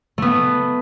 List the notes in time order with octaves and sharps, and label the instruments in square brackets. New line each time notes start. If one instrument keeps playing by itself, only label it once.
[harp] A3 B3